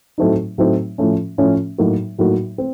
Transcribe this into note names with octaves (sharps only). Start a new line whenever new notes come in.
A2 F#3 A3 C4 D#4
A2 F#3 A3 C4 D#4
A2 F3 A3 C#4
A2 F3 A3 C#4
A2 F#3 A#3 D#4 F#4
A2 F#3 A#3 D#4 F#4
C4